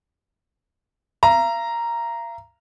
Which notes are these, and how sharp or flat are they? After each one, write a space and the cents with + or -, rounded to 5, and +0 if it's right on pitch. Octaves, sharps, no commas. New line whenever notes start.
F5 -45 A#5 +0